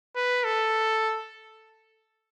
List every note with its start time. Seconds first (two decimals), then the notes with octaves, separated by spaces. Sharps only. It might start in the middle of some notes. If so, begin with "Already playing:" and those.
0.16 B4
0.44 A4